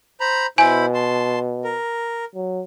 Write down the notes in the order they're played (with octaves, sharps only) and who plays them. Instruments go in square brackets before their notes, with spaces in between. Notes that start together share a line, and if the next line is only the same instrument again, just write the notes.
[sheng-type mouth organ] C5 A#5 B5
[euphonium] B2 [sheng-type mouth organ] E4 C5 B5 [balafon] G#5
[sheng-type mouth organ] A5 C6
A#4
[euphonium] F#3